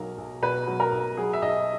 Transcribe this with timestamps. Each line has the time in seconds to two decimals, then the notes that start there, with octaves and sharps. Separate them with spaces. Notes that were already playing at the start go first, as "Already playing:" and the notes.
Already playing: B1 F#3 A#4
0.18 B1
0.42 B2 B4
0.67 F#3
0.80 A#4
0.92 B1
1.17 F#3 G#4
1.33 E5
1.42 B1 D#5